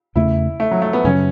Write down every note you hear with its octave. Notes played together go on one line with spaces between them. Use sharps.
E2 C#3 A3 E4
A3
F#3
A3
B3
F#2 C#3 F#3 C#4